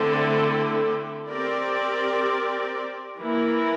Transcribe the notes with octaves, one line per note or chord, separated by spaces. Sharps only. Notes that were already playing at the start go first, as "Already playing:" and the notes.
Already playing: D3 A3 C4 E4 A4
C4 G4 A#4 D5
E3 A#3 E4 A#4